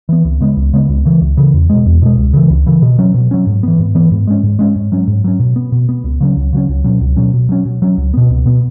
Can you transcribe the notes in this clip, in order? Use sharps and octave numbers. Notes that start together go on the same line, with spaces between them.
E3 B3
C#2
C#3 G#3 B3
C#2
C#3 G#3 B3
C#2
C#3 E3
C#2
C#3 E3
E2
B2 G#3
E2
B2 G#3
C#2
C#3 E3
C#2
C#3 E3
B2
F#3 C#4
B2
F#3 C#4
G#2
E3 B3
G#2
E3 B3
G#2
G#3 C#4
G#2
G#3 C#4
G#2
F#3 C#4
G#2
F#3 C#4
B2
B3
B2
B3
C#2
C#3 F#3 C#4
C#2
C#3 F#3 C#4
C#2
B2 F#3 C#4
C#2
B2 F#3 C#4
B2
F#3 C#4
B2
F#3 C#4
C#2
B2 B3
C#2
B2 B3